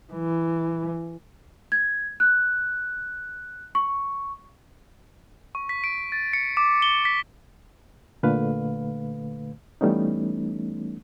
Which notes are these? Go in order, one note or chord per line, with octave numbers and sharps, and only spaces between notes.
E3
G#6
F#6
C#6
C#6
B6
D7
A6
C#7
D6
G7
B6
A#2 D3 A3 B4 F5
E3 G3 A3 B3 C#4 D#4